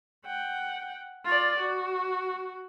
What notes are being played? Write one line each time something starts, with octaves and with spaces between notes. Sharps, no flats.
F#5 G5
F4 D5
F#4